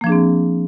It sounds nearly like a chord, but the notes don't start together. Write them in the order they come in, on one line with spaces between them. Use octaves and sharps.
A#3 F3 D4 G#4 C4